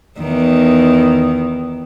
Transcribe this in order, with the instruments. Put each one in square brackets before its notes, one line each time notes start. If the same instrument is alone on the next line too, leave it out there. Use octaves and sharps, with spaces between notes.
[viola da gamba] E2 D#3